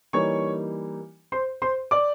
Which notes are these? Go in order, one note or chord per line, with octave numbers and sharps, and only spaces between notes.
E3 G3 A#3 D#4 C#5 C#6
C5 C6
C5 C6
D5 D6